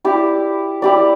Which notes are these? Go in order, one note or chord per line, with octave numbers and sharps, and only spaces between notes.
E4 G4 D5
E4 G4 D5